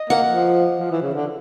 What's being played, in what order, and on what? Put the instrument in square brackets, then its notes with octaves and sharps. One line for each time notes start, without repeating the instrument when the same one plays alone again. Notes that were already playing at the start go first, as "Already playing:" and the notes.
Already playing: [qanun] D#5
[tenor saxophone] A#3 [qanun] F#5
[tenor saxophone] F3
F3
E3
C#3
D3